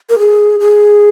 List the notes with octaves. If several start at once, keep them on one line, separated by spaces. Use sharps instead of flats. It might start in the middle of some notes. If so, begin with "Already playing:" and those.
A#4
G#4
G#4